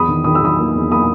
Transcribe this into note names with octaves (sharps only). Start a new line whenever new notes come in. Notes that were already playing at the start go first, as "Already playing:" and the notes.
Already playing: E2 B5 D#6
D#3
D#3 D#6
E6
D#3 B5 D#6
A#3
E2
A#3 B5 D#6